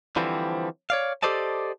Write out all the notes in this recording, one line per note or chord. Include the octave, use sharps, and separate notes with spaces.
D3 E3 F3 G3 C4 E4
C#5 D5 F5
G4 A4 C5 D5 D#5 A5